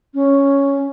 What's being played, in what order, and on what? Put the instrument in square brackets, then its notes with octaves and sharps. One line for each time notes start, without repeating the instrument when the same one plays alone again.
[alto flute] C#4